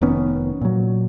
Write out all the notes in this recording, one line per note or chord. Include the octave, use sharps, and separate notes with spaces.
F1 D#3 B3 C#4
A#2 F#3